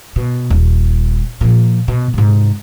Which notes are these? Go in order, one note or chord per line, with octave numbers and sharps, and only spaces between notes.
B2
D#1
A#2 F3
B2
G#2 C3